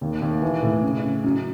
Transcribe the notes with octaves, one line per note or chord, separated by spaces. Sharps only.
D#2
D#2
E3
A2
C#3
C#3
F#2